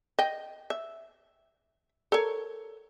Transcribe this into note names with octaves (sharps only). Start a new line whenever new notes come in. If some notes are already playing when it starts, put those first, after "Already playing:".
D#5 G5
E5
A4 A#4 C#5